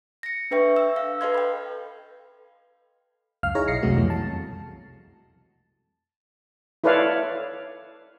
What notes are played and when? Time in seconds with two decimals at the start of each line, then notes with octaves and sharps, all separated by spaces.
0.23 A#6 C#7
0.51 D4 A4 B4 E5 G5 C#6
0.76 E6
0.96 F5
1.21 A4 B4 D#5 F5 C6 G#6
1.34 G5 B5
3.43 C#2 F#2 F5 F6
3.55 D#4 E4 G#4 C#5 F5 A#5
3.68 B1 D#5 A#6 C7 C#7
3.82 C2 F#2 C3 G#3 A3 F#4
3.96 F2 B2 E3 G3 A3
4.10 A5
6.84 E4 A4 B4 C#5 D5 F5